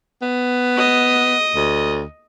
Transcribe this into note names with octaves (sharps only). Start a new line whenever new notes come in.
B3
D#5
D2